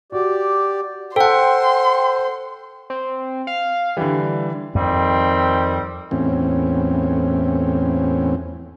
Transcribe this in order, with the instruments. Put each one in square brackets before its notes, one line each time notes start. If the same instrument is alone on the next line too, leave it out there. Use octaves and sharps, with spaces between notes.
[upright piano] F#4 [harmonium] G4 D5
[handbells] A4 F#5 [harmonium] C5 [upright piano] G5 A5 [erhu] C6
[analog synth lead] C4
F5
[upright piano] D3 E3 [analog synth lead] G3
[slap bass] F2 [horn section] D#3 G3 C4
[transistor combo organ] E2 A2 C4 C#4